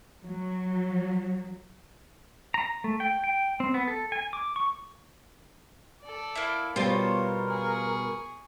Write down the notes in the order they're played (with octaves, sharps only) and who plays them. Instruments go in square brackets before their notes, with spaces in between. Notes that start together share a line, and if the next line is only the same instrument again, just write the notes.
[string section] F#3
[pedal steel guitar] A#5
A3
G5
G5
C4
B3
A4
G#5
D6
C#6
[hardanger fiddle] A4 D5
[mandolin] A#3 E4
[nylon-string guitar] B2 G3 [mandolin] F4 C5 [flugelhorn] A#4 [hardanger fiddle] C#5
[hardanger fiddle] G#4 C#6